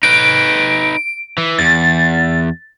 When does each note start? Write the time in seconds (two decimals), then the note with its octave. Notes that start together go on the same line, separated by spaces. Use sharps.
0.03 D#4 B4 D7
1.38 E3
1.59 E2 A6